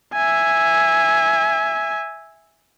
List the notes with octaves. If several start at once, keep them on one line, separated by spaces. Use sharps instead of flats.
E5 G#5